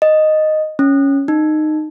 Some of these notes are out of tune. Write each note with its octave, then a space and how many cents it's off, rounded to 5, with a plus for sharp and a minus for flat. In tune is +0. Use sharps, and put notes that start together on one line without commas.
D#5 -5
C#4 +0
D#4 -15